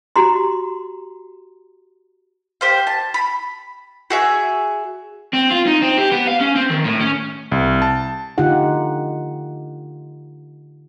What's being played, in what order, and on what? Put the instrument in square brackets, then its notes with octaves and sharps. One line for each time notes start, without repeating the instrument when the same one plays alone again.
[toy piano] F#4 G4 A#5 C6
[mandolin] G4 C5 F5
A5
B5
F#4 G#4 E5
[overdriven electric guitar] C4
F4
D#4
C4
G4
B3
F5
C#4
C4
D#3
A2
C#4
[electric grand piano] C2
A5
[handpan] D3 A3 D#4 F4 G4 F#5